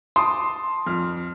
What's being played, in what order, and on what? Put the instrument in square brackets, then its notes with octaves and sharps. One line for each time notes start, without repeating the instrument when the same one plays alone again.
[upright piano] A5 D6 D#6 [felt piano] C6
[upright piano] F2 F6